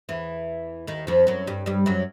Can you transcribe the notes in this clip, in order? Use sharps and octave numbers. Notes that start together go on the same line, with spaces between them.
E2 E3
D#2 D#3
F2 F3
F#2 F#3
G2 G3
G2 G3
F#2 F#3